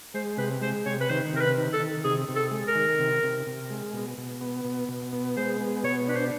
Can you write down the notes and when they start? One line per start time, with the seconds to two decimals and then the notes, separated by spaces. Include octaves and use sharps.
0.14 G#3 C5
0.38 C3 B4
0.62 G#3 C5
0.86 C3 C#5
1.00 B4
1.09 D#3 C5
1.33 C3 A#4
1.40 B4
1.57 D#3
1.73 A4
1.80 D#3
2.04 C3 G#4
2.29 C3
2.36 A4
2.51 G#3
2.67 A#4
2.75 D#3
2.99 C3
3.23 C3
3.47 C3
3.70 G#3
3.93 B2
4.18 B2
4.41 B3
4.65 B2
4.89 B2
5.13 B3
5.37 G#3 C5
5.61 B3
5.83 B2 C#5
6.08 D4 B4
6.15 C5